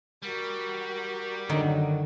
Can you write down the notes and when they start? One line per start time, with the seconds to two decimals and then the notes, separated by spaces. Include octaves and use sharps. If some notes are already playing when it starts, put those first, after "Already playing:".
0.22 G3 F#4 A#4
1.49 F#2 D3 D#3 F#3